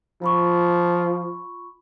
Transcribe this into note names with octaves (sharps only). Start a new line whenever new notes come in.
F3 F4 B5 C#6